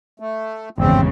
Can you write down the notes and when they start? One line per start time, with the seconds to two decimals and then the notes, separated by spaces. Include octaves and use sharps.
0.20 A3
0.78 G#1 E2 G2 C#3 C4